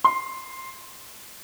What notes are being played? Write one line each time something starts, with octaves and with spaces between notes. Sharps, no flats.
C6